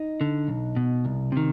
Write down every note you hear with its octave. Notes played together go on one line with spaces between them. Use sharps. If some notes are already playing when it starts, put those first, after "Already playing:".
Already playing: D#4
D3
B1
B2
C2
C3 D#3